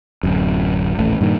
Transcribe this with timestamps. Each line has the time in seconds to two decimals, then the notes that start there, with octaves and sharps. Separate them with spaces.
0.23 D1 F#2
0.98 D#1 A1 A3
1.21 G2 A#2 D#3